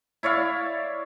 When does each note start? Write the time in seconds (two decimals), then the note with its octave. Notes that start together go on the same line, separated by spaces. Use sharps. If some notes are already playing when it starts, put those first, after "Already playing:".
0.23 E4 C#5 D5 F5